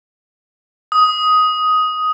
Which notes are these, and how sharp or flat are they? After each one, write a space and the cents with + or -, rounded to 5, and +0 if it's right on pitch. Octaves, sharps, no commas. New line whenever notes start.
D#6 +10